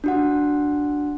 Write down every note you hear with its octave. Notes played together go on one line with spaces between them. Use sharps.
D4 F#4 F#5